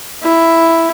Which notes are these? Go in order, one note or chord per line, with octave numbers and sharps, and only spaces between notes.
E4